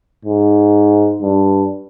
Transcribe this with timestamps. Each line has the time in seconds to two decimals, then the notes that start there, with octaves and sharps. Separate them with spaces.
0.25 G#2
1.22 G2